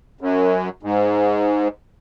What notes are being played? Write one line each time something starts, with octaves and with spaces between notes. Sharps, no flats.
F#2
G#2